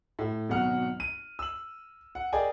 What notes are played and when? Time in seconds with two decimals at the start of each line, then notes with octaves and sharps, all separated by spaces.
0.19 A2
0.49 G#1 B2 F#3 F#5 F6
1.00 D#7
1.39 E6 F#7
2.15 F#5
2.33 G#4 A#4 D5 D#5 G5 G#5